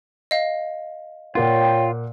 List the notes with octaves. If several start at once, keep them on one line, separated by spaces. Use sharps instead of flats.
D#5 F5
A#2 A#3 F4 C#5 F#5 G5